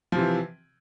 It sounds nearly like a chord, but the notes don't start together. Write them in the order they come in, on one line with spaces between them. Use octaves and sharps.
F3 C3 E3